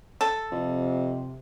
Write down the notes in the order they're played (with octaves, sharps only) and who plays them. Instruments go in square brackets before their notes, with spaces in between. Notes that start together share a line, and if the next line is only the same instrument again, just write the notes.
[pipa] A4
[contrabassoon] F2 [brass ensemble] C3